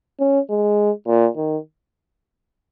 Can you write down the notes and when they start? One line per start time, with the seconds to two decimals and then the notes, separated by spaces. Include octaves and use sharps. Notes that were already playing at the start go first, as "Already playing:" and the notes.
0.19 C#4
0.50 G#3
1.07 A#2
1.36 D#3